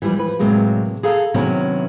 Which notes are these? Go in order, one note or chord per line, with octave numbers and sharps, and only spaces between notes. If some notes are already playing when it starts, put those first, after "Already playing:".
E3 F3 G3 B4
F3 B4
A2 C3 F#3 G#3 A#3
G#4 A4 F5 A#5
C3 D#3 F#3 B3 C#4 E4